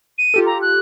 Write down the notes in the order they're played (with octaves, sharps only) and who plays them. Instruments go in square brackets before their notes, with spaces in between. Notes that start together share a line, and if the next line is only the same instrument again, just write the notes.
[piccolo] D#7
[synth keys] F4 G4 A4
[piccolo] A#5
F#6